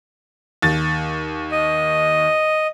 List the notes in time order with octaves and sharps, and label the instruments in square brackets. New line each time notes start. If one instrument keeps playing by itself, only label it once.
[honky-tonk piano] D#2 A6
[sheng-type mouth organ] D#5